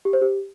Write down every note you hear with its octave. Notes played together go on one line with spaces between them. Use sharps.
G4
C5
G4